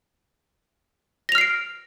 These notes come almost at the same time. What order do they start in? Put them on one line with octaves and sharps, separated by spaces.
A#6 F7 F6 C7 D7